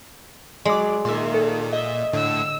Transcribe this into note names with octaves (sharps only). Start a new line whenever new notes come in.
F#3 G#3 D5 D6
A#2 D#3 E5 C6
A4
D#5 E5
A2 D3 E6